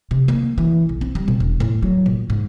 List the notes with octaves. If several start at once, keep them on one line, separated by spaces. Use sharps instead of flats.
C3
A#3
E3
B1
C4
G3
B2
E1
A2
F#3
A#2
G#2